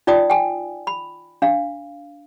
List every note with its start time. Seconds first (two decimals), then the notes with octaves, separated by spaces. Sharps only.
0.07 D#4 F4 D5 G5 D#6
0.30 G5 G#5
0.87 B5
1.42 D4 F5